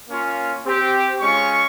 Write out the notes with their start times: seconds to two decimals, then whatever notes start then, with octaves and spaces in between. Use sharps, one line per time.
0.09 A#3 C#4 F4
0.65 C4 G4
1.20 G#3 C#4 F4 C#6